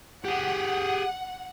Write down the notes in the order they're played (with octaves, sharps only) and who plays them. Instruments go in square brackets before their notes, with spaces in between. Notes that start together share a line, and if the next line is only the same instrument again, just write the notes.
[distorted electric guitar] G4 G#4 [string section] F#5